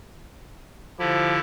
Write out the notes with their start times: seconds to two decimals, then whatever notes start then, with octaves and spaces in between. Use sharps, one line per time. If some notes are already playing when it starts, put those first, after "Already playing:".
0.99 D3 F3 E4 G4